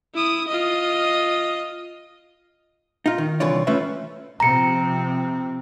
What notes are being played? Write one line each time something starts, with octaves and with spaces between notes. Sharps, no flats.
E4 D#6
F4 D#5
D#4 F4
D#3
C2 D3 E3 F4 C#5 D5
A3 C#4 F4 B4 C#5 E5
C3 F3 C4 A#5 C#7